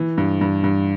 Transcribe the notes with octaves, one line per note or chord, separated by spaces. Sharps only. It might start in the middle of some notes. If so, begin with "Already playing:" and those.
Already playing: E3
G2
G2
G2